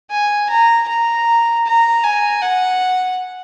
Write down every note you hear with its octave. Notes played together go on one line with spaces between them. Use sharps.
G#5
A#5
A#5
A#5
G#5
F#5